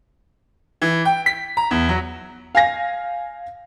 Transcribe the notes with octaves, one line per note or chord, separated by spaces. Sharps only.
E3
G5
B6
A#5
E2
F#3
F5 G#5 A#6